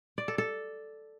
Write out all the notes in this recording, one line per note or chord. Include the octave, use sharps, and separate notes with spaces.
D5
A4
A4